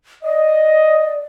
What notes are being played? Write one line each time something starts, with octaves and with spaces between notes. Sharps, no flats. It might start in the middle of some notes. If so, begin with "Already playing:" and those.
D5 D#5